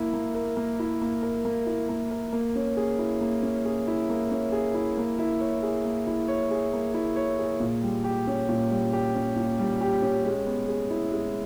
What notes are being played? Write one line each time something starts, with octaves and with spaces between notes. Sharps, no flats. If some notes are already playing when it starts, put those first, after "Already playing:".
Already playing: A#3 E4
A#3
A#4
A#3
E4
A#3
A#4
A#3
E4
A#3
A#4
A#3
C#4
G#4
E4
A#3
C#4
G#4
E4
A#3
C#4
G#4
E4
A#3
E4
C#5
G#4
A#3
E4
C#5
G#4
A#3
E4
C#5
G#4
A#2
G3
G4
C#4
A#2
G3
G4
C#4
A#2
G3
G4
C#4
G#3
B3
G#4
E4
G#3